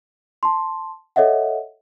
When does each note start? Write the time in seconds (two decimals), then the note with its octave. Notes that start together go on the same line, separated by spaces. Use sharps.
0.43 A5 C6
1.16 A4 C#5 D#5 E5 F#5